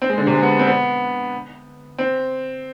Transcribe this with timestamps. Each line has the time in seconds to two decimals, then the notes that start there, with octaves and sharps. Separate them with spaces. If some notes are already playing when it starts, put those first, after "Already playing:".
0.02 C4
0.10 G#3
0.18 D3
0.27 C3
0.34 G#3
0.43 B3
0.59 C4
0.67 B3
1.98 C4